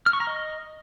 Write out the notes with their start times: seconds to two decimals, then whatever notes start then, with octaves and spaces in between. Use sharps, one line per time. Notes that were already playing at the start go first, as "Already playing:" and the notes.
0.06 F6
0.13 C#6
0.20 A#5
0.27 D#5